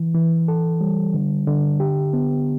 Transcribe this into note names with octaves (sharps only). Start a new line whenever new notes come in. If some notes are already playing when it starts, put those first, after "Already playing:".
Already playing: E3
E3
A4
G3
D3
D3
G4
B3